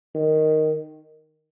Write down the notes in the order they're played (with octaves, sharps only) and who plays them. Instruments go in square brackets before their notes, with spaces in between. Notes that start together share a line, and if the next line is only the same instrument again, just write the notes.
[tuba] D#3